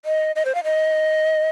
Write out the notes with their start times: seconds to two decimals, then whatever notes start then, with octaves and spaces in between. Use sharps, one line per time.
0.05 D#5
0.36 D#5
0.45 C5
0.55 F5
0.64 D#5